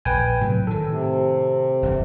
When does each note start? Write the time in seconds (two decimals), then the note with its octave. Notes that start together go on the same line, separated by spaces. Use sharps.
0.05 A#1 B4 G5 G#5
0.41 A2 C3 F#3
0.67 A2 D#3 A4
0.89 C3
1.82 F1 G2 E3